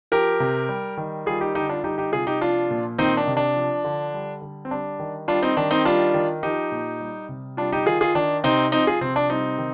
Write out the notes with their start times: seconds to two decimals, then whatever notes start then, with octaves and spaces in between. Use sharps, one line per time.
0.12 F3 G4 A#4
0.40 C3
0.69 G3
0.97 D#3
1.26 G3 F4 G#4
1.41 D#4 G4
1.55 D3 D#4 G4
1.69 D4 F4
1.84 G3 D#4 G4
1.98 D#4 G4
2.12 C3 F4 G#4
2.27 D#4 G4
2.41 F3 D4 F4
2.71 A#2
2.98 D#3 C4 D#4
3.17 D4
3.27 C3
3.37 D4
3.56 F3
3.84 D3
4.14 G3
4.42 D3
4.65 C4
4.71 G3 D4
5.00 D#3
5.28 G3 D4 F4
5.42 C4 D#4
5.57 D#3 D4
5.71 C4 D#4
5.85 G3 D4 F4
6.14 D#3
6.43 F3 D#4 G4
6.72 A#2
7.00 G3
7.29 C3
7.57 G3 D4 F4
7.73 D#4 G4
7.86 D#3 F4 G#4
8.01 F4 G#4
8.15 D#3 D4
8.44 C3 C4 D#4
8.72 F3 C4 D#4
8.87 F4 G#4
9.01 C3 C4
9.16 D4
9.30 G3 C4 D#4
9.58 D#3